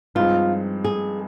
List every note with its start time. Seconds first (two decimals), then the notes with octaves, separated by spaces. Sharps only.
0.15 G2 F3 G#3 C4 D#4 F4
0.84 G#4